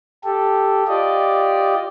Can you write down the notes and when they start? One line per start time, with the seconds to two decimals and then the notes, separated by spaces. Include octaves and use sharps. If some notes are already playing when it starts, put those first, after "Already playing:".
0.24 G4 A4
0.88 F4 G4 D5 D#5